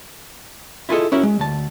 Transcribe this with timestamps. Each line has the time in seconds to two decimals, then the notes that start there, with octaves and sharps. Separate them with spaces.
0.89 E4 F4 G#4 A4 D#5
1.12 C#4 E4 F#4 A#4 E5
1.23 G#3
1.39 D2 A5